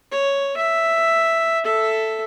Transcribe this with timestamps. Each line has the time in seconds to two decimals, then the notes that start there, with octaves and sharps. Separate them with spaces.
0.12 C#5
0.57 E5
1.64 A4 E5